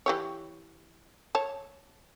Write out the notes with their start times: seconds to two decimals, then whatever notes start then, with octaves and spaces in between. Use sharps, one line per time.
0.06 E3 G4 C#5
1.35 C#5 A5